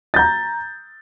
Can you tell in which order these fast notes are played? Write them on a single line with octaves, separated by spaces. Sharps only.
A6 G6 A#5